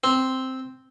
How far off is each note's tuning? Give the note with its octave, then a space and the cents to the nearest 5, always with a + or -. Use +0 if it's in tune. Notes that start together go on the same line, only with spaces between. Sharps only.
C4 +0